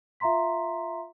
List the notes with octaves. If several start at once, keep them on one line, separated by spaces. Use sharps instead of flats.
F4 E5 F5 A#5 C6 B6